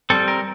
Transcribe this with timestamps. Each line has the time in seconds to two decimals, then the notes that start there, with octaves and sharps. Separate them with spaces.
0.10 G3 C4 A4
0.28 A#4